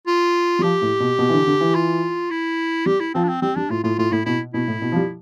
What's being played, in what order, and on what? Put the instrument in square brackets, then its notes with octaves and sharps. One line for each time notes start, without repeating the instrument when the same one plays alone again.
[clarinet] F4
[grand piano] G3
[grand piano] F3 [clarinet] G4
[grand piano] A2
B2
B2
E3
D3
D3
E3
[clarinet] F4
E4
[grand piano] G3 [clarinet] G4
[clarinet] E4
[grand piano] F3 [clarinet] C4
[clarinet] D4
C4
[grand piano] G3 [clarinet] C4
[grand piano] G3 [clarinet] D4
[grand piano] A2 [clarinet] F4
[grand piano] A2 [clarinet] F4
[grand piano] A2 [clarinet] F4
[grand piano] A2 [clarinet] E4
[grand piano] B2 [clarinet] E4
[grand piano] B2 [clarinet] E4
[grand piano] A2
B2
F3
G3